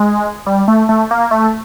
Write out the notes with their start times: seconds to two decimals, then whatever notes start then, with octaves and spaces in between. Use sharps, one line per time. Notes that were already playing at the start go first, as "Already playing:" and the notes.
Already playing: G#3
0.46 G3
0.68 A3
0.89 A3
1.11 A#3
1.31 A3